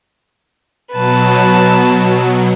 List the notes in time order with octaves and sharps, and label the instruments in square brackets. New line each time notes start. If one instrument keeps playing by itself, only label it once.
[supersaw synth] B2 F#3 [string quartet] B4 A5